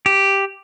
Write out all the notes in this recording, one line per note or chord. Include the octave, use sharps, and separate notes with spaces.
G4